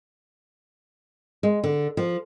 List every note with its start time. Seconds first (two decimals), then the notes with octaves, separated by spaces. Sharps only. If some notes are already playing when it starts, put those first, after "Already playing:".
1.43 G#3
1.64 D3
1.97 F3